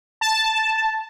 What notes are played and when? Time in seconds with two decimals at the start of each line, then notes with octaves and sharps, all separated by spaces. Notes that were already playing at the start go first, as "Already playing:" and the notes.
0.21 A5